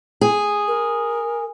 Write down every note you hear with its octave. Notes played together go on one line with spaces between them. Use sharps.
G#4
A#4